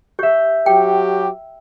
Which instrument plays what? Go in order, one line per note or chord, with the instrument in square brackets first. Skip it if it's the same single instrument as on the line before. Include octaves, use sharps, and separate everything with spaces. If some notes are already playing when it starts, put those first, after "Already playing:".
[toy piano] G4 [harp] E5 G6
[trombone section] F#3 G4 [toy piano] G5